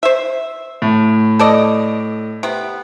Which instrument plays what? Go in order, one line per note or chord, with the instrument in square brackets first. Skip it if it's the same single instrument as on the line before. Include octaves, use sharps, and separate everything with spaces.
[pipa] C5 E5
[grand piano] A2
[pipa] A4 D5 D#5
C3 B3